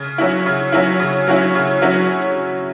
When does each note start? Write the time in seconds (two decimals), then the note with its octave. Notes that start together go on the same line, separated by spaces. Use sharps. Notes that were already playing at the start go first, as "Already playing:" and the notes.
Already playing: C#3
0.18 F#3 C#4 E4
0.46 C#3
0.72 F#3 C#4 E4
1.00 C#3
1.28 F#3 C#4 E4
1.55 C#3
1.82 F#3 C#4 E4